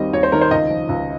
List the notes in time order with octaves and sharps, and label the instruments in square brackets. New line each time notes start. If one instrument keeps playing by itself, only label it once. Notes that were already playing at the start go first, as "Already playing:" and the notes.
Already playing: [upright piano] D#2 D#3 G3 C4 [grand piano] D#5
[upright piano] D#2 [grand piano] C#5
[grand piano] C5
[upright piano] D#3 [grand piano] A#4
[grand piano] C5
[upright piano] C#2 [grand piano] D#5
[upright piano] F3
C#2